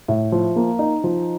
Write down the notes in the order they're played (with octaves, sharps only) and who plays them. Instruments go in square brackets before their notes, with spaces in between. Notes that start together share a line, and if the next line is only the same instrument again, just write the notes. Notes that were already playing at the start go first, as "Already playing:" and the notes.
[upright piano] A2
F3
A#3
D#4
F3